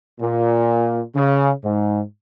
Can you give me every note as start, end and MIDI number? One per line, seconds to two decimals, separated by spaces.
0.20 1.01 46
1.15 1.51 49
1.62 2.01 44